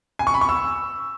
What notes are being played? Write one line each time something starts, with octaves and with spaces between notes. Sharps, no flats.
G#5
C#6
B5
C#6
E6